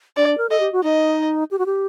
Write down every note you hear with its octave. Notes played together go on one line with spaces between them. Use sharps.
D4 D5
A#4
A4 D#5
G4
F#4
D#4 D#5
G4
F#4
G4